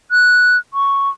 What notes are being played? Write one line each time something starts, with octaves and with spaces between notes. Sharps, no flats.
F#6
C#6